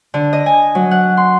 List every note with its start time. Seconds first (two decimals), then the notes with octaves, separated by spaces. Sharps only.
0.14 D3
0.33 D#5
0.46 G#5
0.75 F#3
0.91 F#5
1.17 C6